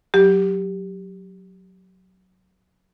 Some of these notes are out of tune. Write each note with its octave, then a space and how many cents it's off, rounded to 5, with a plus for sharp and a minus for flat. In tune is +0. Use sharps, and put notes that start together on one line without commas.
F#3 +0 G4 +0